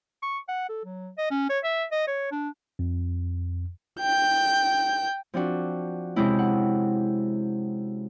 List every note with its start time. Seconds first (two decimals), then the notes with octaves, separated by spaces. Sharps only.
0.23 C#6
0.48 F#5
0.69 A4
0.85 F#3
1.18 D#5
1.31 C#4
1.50 C#5
1.64 E5
1.92 D#5
2.07 C#5
2.32 D4
2.79 F2
4.00 G5 G6
5.34 F3 C4 D4 F#4
6.16 C3 G#3 C4 C#4 E4
6.39 F#5